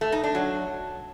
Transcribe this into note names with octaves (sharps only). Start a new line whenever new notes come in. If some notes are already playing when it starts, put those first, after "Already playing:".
A3
D#4
D4
F#3